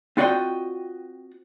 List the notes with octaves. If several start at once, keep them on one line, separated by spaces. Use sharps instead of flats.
C4 F4 F#4 D5 D#5 G5